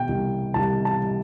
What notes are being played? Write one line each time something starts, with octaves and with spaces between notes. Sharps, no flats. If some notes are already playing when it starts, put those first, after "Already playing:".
Already playing: B2 G5
C2
C2 A5
A5
G3